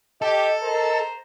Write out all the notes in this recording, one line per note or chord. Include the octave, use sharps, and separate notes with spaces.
G4 A4 D#5
A#4 C5 D#5 A#5